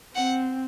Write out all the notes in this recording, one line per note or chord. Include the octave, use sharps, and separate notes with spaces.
C4 F#5